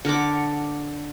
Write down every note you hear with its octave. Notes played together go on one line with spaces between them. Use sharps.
D3 A#4 F#5 D6